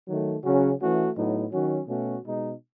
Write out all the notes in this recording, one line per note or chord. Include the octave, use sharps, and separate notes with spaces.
D#3 F#3 A3
C#3 F#3 C#4 F#4
E3 A3 C#4 F#4
A2 F#3 B3 D#4
D#3 F#3 C#4 F#4
B2 A3 C#4 F#4
B2 G#3 D#4